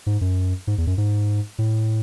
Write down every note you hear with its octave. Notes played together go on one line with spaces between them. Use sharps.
G#2
F#2
G#2
E2
F#2
G#2
A2